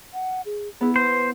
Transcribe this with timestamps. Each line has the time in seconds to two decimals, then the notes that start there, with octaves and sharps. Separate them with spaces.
0.14 F#5
0.46 G#4
0.81 B3 E4 G#4
0.96 B4 C5